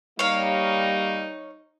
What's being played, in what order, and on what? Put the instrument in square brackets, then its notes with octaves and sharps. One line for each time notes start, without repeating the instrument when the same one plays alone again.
[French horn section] G3 [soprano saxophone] A#3 [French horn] D#4 [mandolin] C#5 F5